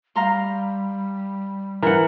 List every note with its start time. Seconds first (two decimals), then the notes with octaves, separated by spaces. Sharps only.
0.16 G3 F5 A#5 C6
1.82 E3 A#4 F#5